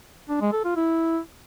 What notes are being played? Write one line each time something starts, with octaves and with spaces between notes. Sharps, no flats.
D4
G#3
A4
F4
E4